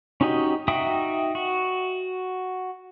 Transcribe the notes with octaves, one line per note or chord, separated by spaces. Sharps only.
C#4 D#4 F#4 G4 D#5
D#4 F#4 E5 G5 D#6
F#4